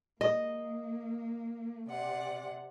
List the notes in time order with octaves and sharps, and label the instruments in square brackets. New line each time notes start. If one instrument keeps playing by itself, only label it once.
[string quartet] A#3 [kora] D#5
[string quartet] C3 D5 F#5